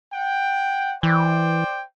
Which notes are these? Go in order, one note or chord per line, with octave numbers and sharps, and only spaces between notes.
F#5 G5
E3 C5 D5 G5